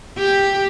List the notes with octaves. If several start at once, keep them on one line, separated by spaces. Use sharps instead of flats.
G4